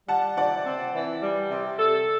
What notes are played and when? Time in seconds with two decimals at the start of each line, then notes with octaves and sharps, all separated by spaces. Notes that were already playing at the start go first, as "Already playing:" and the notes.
0.08 G3 F#5 A5
0.37 C3 D5 F#5
0.65 C4
0.94 E3
1.22 G3
1.50 C3
1.79 A4